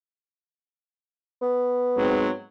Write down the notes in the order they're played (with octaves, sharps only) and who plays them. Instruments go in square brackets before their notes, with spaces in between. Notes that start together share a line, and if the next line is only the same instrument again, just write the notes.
[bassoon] B3
[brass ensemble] G#2 F#3 C4